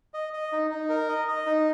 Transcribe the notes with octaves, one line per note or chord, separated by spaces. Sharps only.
D#5
D#5
D#4
D#4
A#4
D#5
D#5
D#4